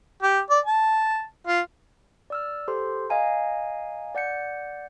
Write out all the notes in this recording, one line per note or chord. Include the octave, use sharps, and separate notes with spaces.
G4
D5
A5
F4
D5 E6 F6
G4 A4 C5 C6
D#5 F5 G#5 A#5
D5 F#5 G6 C#7